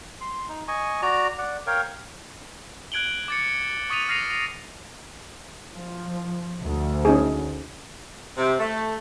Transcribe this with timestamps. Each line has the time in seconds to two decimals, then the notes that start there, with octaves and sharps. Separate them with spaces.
0.21 C6
0.49 D#4
0.68 D#5 G#5 C#6
1.02 F#4 D5 A#5
1.38 D5 F#5
1.67 A#4 C#5 F5 G5
2.92 F#6 G#6 D7 F#7 G7
3.28 D6 A6 C#7
3.90 C#6 D#6 A6 B6 D#7 F7
4.09 F6 A#6 C7 D#7 F7
5.74 F3
6.62 D2
7.05 C#4 D#4 G#4
8.37 C3
8.59 A3